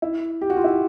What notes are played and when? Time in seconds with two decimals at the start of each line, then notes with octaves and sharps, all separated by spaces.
0.02 E4
0.42 G4
0.50 F#4
0.57 F4
0.64 E4